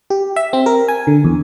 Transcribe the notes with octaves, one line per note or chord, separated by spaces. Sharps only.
G4
E5
C4
A#4
G#5
D3
E2